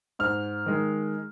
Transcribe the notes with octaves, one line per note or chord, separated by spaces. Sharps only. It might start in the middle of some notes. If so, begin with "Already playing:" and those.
G#2 F6
D#3 G#3